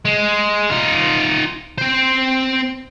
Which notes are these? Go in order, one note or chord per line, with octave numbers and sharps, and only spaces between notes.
G#3
D#4 F4
C4 C5